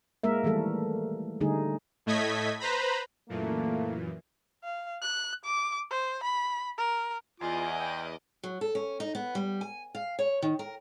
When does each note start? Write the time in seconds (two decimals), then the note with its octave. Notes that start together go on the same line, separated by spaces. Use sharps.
0.23 G#3 A#3 A#4 E5
0.43 D#3 E3 G3 A3 A4
1.41 D3 G3 A3 D#4 G#4
2.06 A2 A3 D#5 G#6 B6
2.60 B4 C5 A#5 B5
3.29 F#2 A#2 E3 A3 A#3
4.64 F5
5.02 F#6
5.44 D6
5.90 C5
6.24 B5
6.78 A#4
7.40 E2 F4 D5 D#5 G#5 D6
7.80 G5
8.43 F#3
8.61 A4
8.75 C#4
9.00 D#4
9.15 B3
9.35 G3
9.61 G#5
9.95 F5
10.19 C#5
10.42 D#3
10.59 A#4